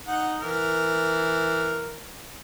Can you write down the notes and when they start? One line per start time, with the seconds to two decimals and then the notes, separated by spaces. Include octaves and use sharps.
0.07 D#4 F#5
0.42 E3 A#4